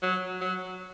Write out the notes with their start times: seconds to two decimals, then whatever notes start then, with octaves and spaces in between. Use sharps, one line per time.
0.02 F#3
0.41 F#3